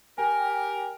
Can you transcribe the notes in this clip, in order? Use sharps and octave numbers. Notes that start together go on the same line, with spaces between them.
G4 A#4 G#5